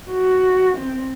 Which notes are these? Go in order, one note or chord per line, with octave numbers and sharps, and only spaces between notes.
F#4
C4